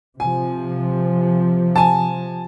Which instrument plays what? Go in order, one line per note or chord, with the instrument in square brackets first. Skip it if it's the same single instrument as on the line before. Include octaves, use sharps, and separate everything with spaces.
[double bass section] C3 F3 [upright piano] G#5
[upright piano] G#5 A5